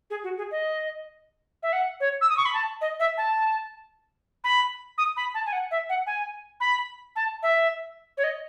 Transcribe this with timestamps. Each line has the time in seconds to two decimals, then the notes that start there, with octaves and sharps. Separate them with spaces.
0.10 G#4
0.24 F#4
0.38 G#4
0.51 D#5
1.63 E5
1.73 F#5
2.00 C#5
2.21 E6
2.30 D#6
2.37 C#6
2.46 B5
2.54 A5
2.81 D#5
3.00 E5
3.17 A5
4.44 B5
4.98 D#6
5.17 B5
5.34 A5
5.46 G#5
5.53 F#5
5.71 E5
5.89 F#5
6.07 G#5
6.60 B5
7.16 A5
7.43 E5
8.17 C#5
8.24 D#5